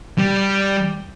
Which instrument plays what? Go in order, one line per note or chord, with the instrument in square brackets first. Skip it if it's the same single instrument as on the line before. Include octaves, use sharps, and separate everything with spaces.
[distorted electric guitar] G3